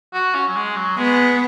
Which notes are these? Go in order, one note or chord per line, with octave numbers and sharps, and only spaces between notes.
F#4
C#4
F#3
G#3
F#3
G#3 B3